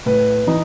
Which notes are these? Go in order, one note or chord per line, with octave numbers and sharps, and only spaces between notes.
A2 B4
E3 D#4